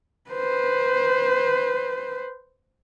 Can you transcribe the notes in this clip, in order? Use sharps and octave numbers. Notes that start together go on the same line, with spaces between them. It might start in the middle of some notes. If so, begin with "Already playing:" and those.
B4 C5